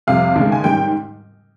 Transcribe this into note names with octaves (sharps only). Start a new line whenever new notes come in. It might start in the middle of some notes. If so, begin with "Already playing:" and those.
F2 C3 G3 F5
D#2 C#3 G#3
G#5
G#2 D#3 G3 C#4 G5